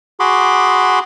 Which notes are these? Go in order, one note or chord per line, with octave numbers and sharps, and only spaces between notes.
F#4 G#4 B5 C6 D6